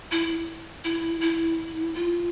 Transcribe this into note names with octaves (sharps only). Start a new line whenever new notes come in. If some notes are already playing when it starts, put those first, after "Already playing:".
E4
E4
E4
F4